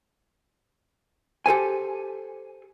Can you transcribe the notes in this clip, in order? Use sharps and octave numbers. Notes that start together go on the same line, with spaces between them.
G4 A4 C5 G#5